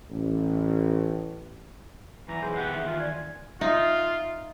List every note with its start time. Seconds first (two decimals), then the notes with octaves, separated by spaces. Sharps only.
0.10 A1
2.28 E2 E3 A#5
2.42 B1 G#4 C5
2.56 B3 G4 F#5
2.72 E2 D#3 E5
2.86 F4
2.99 D5 G#5
3.61 D#4 F4 E5